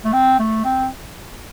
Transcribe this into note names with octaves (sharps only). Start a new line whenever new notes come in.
A3
C4
A3
C4